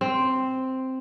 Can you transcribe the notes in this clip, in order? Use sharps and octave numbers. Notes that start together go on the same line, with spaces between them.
C4